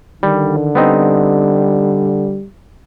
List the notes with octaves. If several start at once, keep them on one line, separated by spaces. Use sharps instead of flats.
D3 D#3 G3
G3 B3 C4 D#4